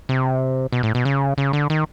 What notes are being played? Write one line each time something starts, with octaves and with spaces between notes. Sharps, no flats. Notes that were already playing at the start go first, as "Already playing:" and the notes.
C3
B2
A2
B2
C#3
C#3
D3
D#3